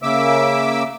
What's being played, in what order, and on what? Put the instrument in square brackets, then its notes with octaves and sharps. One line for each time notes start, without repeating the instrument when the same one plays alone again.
[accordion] C#3 A#3 E5 D6 E6